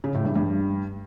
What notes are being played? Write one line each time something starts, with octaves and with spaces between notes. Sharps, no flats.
C#3
A2
G2
G2